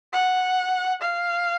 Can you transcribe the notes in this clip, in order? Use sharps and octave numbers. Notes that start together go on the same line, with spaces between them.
F#5
F5